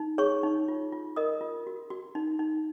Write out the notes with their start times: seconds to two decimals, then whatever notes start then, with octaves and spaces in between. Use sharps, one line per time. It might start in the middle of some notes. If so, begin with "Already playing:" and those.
Already playing: D#4
0.18 G#4 C#5 C#6
0.43 D#4
0.68 F4
0.92 F4
1.16 A#4 D#5 D#6
1.41 F4
1.67 F#4
1.90 F#4
2.15 D#4
2.39 D#4